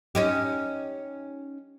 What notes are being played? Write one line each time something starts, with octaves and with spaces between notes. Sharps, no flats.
C#4 D#4 G4